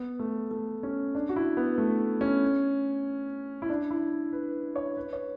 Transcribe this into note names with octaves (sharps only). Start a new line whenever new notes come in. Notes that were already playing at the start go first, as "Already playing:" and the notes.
Already playing: B3
A3
A3
C#4
D4
F#4
E4
B3
A3
C#4
E4
D4
E4
B4
C#5
B4
C#5